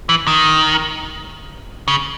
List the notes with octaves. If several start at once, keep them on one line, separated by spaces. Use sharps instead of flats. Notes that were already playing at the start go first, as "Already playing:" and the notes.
E3
D#3
C#3